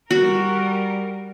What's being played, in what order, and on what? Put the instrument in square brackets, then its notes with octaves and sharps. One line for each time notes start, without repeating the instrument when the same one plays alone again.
[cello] G3 A#4 [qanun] F#4